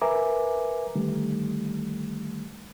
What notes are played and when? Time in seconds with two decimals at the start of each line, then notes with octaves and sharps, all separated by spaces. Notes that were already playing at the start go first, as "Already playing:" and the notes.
0.01 A#4 B4 E5 G#5 A#5 D6
0.96 D3 D#3 G3 A3